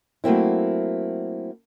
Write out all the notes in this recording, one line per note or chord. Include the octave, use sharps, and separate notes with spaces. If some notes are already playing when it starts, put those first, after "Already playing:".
F#3 A3 A#3 C4 E4